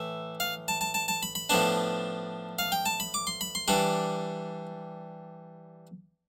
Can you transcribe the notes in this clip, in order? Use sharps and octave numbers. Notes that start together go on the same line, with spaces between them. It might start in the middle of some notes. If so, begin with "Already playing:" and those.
Already playing: A2 E3 E5
F5
A5
A5
A5
A5
B5
B5
A2 F3 B3 D4 A5
F5
G5
A5
B5
D6
C6
B5
C6
E3 G3 D4 D6